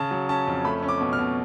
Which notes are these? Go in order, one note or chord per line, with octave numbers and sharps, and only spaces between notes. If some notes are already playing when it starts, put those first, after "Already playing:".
Already playing: C#3 A5
F#3
C#4 A5
F2
A3 B5
C#4
D6
B2
F6
B2